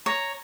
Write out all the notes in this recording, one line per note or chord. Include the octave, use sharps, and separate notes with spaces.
C#5 A#5